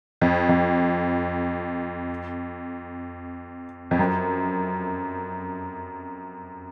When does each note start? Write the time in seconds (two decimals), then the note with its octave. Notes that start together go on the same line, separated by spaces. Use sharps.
0.21 F2
0.49 F2
3.91 F2
3.99 F#2